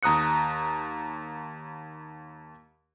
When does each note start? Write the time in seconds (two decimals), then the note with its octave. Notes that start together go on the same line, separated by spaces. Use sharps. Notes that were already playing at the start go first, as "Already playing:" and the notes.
0.03 D#2 A#5 D#6 F#6 C#7